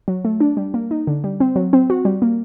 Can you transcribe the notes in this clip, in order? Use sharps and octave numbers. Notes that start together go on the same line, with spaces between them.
F#3
A3
D4
G3
A#3
D#4
D3
G3
C4
F#3
C4
F#4
G3
A#3